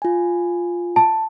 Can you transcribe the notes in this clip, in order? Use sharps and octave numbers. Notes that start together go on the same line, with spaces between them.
F4 G#5
A5